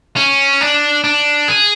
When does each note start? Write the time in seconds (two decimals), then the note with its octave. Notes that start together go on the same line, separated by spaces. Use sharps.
0.16 C#4
0.61 D4
1.04 D4
1.48 G#4